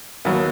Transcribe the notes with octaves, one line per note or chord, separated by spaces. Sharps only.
D#2 D#3 F#3 B3